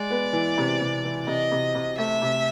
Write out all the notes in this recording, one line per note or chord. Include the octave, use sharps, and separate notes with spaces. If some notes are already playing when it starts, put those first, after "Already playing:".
Already playing: G#3 D5
B3
E3
C3
C3
E3
C3 D#5
C3
C3
A3 E5
C3